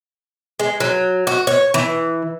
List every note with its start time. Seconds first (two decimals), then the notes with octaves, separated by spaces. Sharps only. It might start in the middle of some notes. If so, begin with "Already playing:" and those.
0.60 G#3
0.80 F#3
1.27 F#4
1.47 C#5
1.74 E3